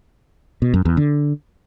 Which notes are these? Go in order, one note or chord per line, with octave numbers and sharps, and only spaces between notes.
B2
F#2
E2
D3